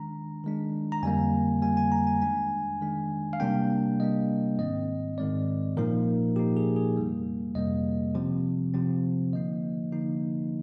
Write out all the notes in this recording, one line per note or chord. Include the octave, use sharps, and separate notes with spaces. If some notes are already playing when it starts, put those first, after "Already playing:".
Already playing: D#3 G#3 D4 A#5
D#3 G#3 D4
A#5
F2 D3 G3 A#3 G#5
F2 D3 G3 A#3 G#5
G#5
A#5
G#5
D#3 G#3 D4 G#5
D#3 G#3 D4
F5
C3 G3 A#3 D4 G5
C3 G3 A#3 D4 D#5
G#2 D#3 G#3 C4 D#5
G#2 D#3 G#3 C4 D5
A#2 F3 A#3 D#4 A#4
A#2 F3 A#3 D#4 G4
G#4
G#4
F2 C3 G3 A#3
F2 C3 G3 A#3 D#5
C3 F3 C4
C3 F3 C4
D3 F3 A#3 D#4 D#5
D3 F3 A#3 D#4